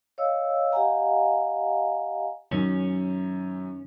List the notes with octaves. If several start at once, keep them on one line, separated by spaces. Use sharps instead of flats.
C#5 D#5 F5 E6
G4 D#5 F5 F#5 G#5 A#5
F#2 D#3 C#4